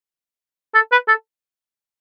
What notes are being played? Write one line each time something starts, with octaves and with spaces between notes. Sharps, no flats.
A4
B4
A4